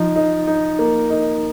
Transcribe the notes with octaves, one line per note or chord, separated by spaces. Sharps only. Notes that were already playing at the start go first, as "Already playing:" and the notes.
Already playing: F3 D#4
D#4
D#4
A#3
D#4